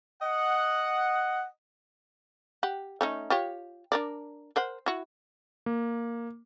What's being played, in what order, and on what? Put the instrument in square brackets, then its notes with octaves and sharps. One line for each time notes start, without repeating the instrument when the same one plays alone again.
[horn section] D#5 F#5
[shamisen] G4 F#5
A3 C#4 D#4
F4 G4 C#5
D4 A#4 D5
A#4 C5 F#5
E4 F#4
[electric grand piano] A#3